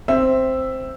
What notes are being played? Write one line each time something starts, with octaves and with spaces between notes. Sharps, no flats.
C4 E5